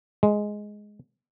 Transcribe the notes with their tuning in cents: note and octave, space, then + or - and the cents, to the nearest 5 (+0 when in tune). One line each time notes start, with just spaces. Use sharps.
G#3 +5